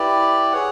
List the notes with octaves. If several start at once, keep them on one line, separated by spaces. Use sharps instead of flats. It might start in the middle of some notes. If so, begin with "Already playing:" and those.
Already playing: E4 G4 B4 D5
G#4 C#5 F#5